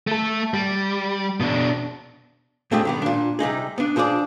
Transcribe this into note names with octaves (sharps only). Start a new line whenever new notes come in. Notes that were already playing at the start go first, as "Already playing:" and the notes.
A3 A4
G3
B2 D4
B2 A3 C4 D4 G4 G#4
D#3 G3 B3
A#2 D4
C3 G3 D#4 G#4
B3 D4
F3 D4 G#4 B4 D5